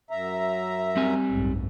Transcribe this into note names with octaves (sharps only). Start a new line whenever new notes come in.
F#2 E5 A#5
G3 C4 G#5
F#1 B1 G#2